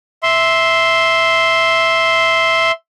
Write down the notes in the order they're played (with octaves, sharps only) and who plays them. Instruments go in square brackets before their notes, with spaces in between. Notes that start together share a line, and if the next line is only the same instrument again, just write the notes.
[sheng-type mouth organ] E5 C6